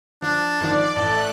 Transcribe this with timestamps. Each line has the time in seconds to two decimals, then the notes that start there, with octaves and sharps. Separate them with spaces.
0.22 F3 D4
0.60 G#1 D#3 F3 D5
0.96 A1 A3 A5 F#6